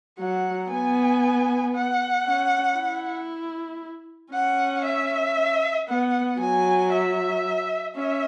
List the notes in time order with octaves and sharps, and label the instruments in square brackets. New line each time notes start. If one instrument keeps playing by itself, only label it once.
[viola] F#3 [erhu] F#5
[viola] B3 [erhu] G#5
[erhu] F#5
[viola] C#4
E4
[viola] C#4 [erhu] F#5
[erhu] E5
[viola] B3 [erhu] F#5
[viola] F#3 [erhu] G#5
[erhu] E5
[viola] C#4 [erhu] E5